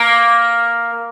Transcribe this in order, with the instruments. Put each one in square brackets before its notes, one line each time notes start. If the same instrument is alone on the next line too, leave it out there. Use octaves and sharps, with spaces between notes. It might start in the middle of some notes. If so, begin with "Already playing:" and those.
Already playing: [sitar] A#3